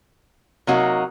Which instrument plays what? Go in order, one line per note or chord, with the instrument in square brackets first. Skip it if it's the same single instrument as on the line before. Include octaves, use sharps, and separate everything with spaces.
[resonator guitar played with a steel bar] C3 F#3 A#3 D#4 F#4